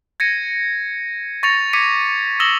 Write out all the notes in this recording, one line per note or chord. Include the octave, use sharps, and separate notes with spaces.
G#6 A#6 C#7 D#7
C#6 A6 A#6 C#7 F7
D6 G#6 B6 C#7 D#7
D#6 E6 A#6 E7 F#7 G7